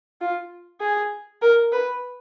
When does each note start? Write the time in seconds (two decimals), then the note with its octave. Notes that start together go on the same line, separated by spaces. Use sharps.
0.21 F4
0.80 G#4
1.42 A#4
1.72 B4